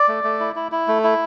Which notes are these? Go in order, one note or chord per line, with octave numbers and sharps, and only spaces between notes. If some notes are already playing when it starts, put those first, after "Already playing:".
Already playing: D5
A3
A3
E4
E4
E4
A3
E4